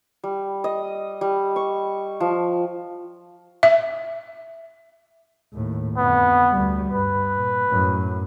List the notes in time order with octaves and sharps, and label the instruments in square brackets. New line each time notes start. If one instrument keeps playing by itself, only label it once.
[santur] G3
D#5
G3
C#6
F3
[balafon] E5
[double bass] D#2 A2
[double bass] F2 D3 [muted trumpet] B3
[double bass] D2 G3
[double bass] G2 [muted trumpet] B4
[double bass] A#2
F#2 A2